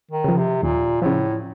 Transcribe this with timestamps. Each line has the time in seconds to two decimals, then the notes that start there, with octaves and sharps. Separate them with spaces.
0.11 D#3
0.24 C#3 F3
0.37 C3
0.63 D#2 A#2
1.02 A2 C#3 F3